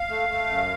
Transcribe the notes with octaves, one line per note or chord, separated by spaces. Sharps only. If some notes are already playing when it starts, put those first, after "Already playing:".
Already playing: F5
A3
A3
F#2